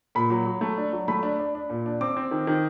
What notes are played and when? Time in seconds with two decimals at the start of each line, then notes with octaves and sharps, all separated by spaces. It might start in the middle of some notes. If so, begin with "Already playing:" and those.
0.15 A#2 B5
0.30 F#3
0.46 F#3
0.61 A3
0.78 D4
0.93 F#3
1.08 A3 B5
1.23 D4
1.40 D4
1.55 D4
1.70 A#2
1.86 D4
2.01 C4 D6
2.17 C4
2.31 D#3
2.47 D#3